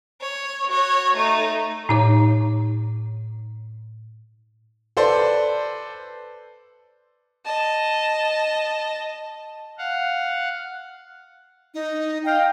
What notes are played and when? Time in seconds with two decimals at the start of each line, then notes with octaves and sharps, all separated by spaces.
0.21 C#5
0.68 F#4 C#5
1.14 A3 D#4
1.89 A2 D#4 C#5
4.97 A4 B4 C5 D5
7.45 D#5 A5
9.78 F5 F#5
11.74 D#4
12.25 D#5 F5 G5